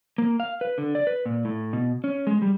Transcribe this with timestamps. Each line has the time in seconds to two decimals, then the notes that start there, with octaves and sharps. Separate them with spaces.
0.18 A#3
0.40 F5
0.61 B4
0.78 D3
0.95 D5
1.07 B4
1.26 A#2
1.45 A2
1.73 B2
2.04 C#4
2.27 G#3
2.42 G3